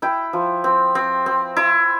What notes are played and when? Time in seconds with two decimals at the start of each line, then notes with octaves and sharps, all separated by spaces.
0.02 E4 G5
0.33 F3
0.64 C4
0.95 C4
1.26 C4
1.56 E4